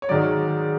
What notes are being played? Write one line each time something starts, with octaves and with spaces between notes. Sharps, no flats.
C#5
G#2 D#3 F#3 D5